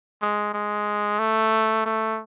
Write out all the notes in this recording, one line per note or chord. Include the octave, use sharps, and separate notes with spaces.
G#3
G#3
A3
A3